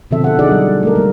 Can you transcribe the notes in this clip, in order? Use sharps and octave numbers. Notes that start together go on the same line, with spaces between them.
B2 D3 F3 C4 A4 E5
A4 F#5
D4 D#4 F#4 G#4 D5 F#5
F#3 G3
A3 A4 A#4
G3 G#3 A#3